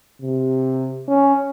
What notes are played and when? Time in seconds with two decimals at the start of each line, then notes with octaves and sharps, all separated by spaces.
0.21 C3
1.08 C#4